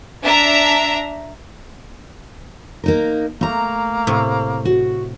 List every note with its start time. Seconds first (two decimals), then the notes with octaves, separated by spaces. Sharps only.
0.22 D4 E5 A#5
2.84 A#3 D#4 A#4
3.41 A3 A#3 A#5
4.07 A2 C3
4.65 F#4